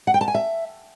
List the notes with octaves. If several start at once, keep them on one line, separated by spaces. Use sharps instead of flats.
F#5
G5
A5
G#5
E5